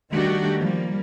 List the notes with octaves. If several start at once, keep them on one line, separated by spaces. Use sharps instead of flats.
D#3 G3 A3 D4 F#4 G4
F3 G3 A#3